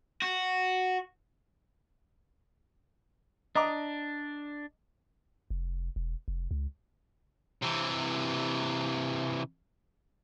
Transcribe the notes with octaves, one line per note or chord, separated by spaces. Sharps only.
F#4
D4 D#5 A#5 D6
F1
E1
F1
C#2
C3 E3